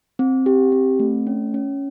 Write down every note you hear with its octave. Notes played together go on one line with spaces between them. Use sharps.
C4
G4
C4
A3
C#4
C#4